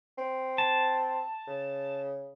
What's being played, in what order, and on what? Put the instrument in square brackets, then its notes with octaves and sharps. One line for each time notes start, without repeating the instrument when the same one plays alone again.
[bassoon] C4
[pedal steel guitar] A5
[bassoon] C#3